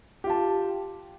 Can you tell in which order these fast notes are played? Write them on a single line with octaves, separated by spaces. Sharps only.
G4 F4 A5